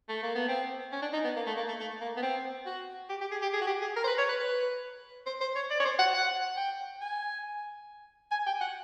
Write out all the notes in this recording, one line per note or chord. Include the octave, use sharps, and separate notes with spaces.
A3
A#3
B3
C4
C#4
D4
D#4
B3
A#3
A3
A#3
A3
A3
A#3
B3
C4
F#4
G4
G4
G#4
G4
G#4
F#4
G4
G#4
A#4
C5
B4
C#5
B4
B4
C5
C5
C#5
D5
C#5
C5
F#5
F#5
G5
G#5
G#5
G5
F#5